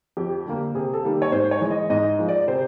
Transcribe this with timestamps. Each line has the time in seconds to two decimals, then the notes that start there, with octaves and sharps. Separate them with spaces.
0.17 F2 G4
0.46 D3 G3 A#3
0.75 C3 G#4
0.94 A4
1.03 D#3 G3 A#3
1.22 C#5
1.32 G#2 C5
1.51 C#5
1.61 E3 G#3
1.71 D#5
1.90 G#2 D#5
2.19 F3 G#3
2.28 D5
2.48 C3 C5